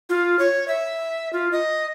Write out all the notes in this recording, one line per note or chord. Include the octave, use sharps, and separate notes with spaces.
F4
C#5
E5
F4
D#5